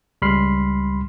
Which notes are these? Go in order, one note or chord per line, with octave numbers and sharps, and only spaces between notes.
C#2 G3 B5 C6 F6 C7